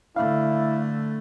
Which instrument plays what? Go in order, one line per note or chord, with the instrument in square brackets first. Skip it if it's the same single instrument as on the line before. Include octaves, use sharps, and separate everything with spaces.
[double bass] D3 A3 [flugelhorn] E4 [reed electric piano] F5